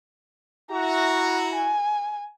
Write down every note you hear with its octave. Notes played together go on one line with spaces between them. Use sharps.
E4 F#4 A#5
G#5